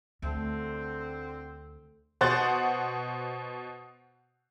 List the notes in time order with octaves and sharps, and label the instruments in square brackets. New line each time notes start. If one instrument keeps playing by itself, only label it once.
[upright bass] D2 [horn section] D3 C4 [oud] A3
[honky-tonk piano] B2 C5 F#5 F#6 A6